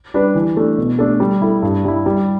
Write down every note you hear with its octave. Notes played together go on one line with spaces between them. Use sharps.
G3 D4 B4
E3
A3 D4
B2
A3 D4 A4
G3
E4 A4
G2
G3 E4
G3